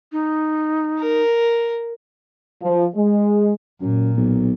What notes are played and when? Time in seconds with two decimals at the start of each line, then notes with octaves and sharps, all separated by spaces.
0.12 D#4
1.00 A#4
2.62 F3
2.95 G#3
3.81 F#2 A#2
4.17 B1